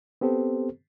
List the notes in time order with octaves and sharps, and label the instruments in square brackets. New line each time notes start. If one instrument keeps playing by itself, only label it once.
[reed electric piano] B3 C4 G4 A4 C5